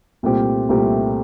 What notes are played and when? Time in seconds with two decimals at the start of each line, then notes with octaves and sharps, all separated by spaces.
0.23 C2 A#2 A3 C4 G4
0.69 C2 A#2 A3 C4 G4